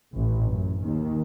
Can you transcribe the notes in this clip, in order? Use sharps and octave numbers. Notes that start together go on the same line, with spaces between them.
A1 A2
F#2
D#2 D#3